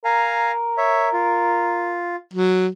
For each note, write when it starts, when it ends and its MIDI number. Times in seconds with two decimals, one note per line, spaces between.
0.05 2.05 70
0.05 0.51 77
0.05 0.51 80
0.05 0.51 82
0.78 1.09 73
0.78 1.09 76
1.13 2.16 65
2.33 2.67 54